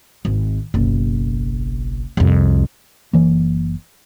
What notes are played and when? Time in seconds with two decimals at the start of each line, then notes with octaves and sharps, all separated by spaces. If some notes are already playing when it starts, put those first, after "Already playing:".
0.25 G#1
0.74 F#1 B1
2.17 C2 F2
3.13 F#1 E3 A#3